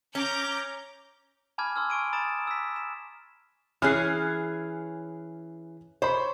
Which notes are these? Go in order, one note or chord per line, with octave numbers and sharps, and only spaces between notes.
C#4 A#5 D6 G6
G#5 A5 B5 D6 F6 G#6
C6 E6 F6
G#5 C#6 D7 D#7
A#5 B5 D#6 A6 D7 E7
E6 B6
E7
E3 C#4 G#4 F6 F#6 C7
C5 C#5 B5